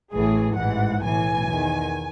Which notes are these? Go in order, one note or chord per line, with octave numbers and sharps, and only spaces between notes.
A1 A2 E3 G#4
A1 G#2 E3 F#5
B1 A2 E3 G#5
E2 D#3